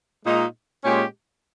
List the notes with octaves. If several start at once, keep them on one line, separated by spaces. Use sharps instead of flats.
A#2 G#3 D#4
A#2 G#3 C#4 G4